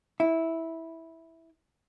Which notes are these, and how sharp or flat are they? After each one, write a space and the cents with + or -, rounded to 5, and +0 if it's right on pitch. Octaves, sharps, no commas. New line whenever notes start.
E4 -10